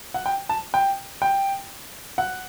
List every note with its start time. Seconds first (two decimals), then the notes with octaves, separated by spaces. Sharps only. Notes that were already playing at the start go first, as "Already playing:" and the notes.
0.14 F#5
0.26 G5
0.49 A5
0.74 G5
1.22 G5
2.18 F#5